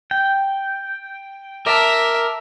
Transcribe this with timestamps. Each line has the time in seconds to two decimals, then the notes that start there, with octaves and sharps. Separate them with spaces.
0.11 G5
1.66 A#4 E5 A5 D6